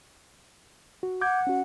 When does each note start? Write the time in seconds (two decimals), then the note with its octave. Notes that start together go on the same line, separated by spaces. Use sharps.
1.03 F#4
1.21 F#5 D6 G6 G#6
1.47 C#4 F#4